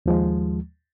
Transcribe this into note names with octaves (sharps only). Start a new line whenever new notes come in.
D#2 F3 G#3